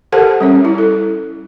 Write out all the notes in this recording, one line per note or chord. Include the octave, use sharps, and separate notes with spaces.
G4 A4 A#4 C5 F#5 A5
G3 C#4 C#5
E4
A4